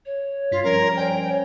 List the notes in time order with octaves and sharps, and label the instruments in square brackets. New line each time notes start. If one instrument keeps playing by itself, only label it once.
[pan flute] C#5
[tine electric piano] G2 B6 [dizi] F4
[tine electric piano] F3 G3 C#4 [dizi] A#4
[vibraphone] C5 D5 G#5 [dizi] G5
[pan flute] C#5